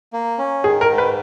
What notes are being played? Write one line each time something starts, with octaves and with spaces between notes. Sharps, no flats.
A#3
C#4
D#3 G#4
A#4
G#2
B4